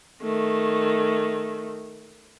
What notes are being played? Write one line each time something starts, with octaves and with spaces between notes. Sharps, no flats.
D#3 A3